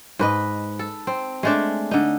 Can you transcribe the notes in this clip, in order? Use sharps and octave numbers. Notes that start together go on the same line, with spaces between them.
G#2 B4 D#5
A4
C4
G#3 A3 D4
D3 D#4